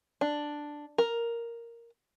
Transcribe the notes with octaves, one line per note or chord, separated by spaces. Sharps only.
D4
A#4